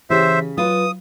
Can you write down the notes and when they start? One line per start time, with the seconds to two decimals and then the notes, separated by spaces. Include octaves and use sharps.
0.10 C#3 E3 G4 C5 E5 B6
0.58 F#3 F4 B4 D#6